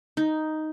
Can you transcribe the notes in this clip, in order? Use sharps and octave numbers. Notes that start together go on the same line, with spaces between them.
D#4